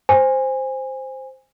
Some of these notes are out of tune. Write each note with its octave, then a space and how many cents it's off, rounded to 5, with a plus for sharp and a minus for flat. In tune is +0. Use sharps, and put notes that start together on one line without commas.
C5 +0 G#5 -20